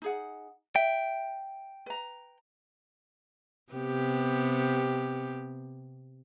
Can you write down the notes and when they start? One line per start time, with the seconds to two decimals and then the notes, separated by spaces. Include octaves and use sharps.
0.02 D#4 G#4 F#5
0.76 E5 G5
1.86 B4 A#5
3.73 C3 B3 G4